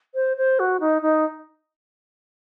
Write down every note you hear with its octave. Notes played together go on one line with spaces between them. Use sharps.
C5
C5
F#4
D#4
D#4